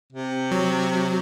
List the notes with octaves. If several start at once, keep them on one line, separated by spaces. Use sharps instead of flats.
C3
F#3